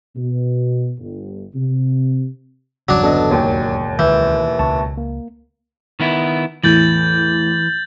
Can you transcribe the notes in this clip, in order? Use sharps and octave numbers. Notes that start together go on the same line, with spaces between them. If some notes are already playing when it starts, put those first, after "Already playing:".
B2
G1
C3
G1 E2 C#3 F#3 D4
D3 B3 A4 D#5
E1 D#2 C#5 G5
C#2 D#3 E3 G6
C#2 A5 C#6
A#3
D#3 B3 E4
E2 A2 E3 G6 A6 F#7